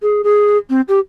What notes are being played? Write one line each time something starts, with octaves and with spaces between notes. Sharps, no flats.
G#4
G#4
C4
G4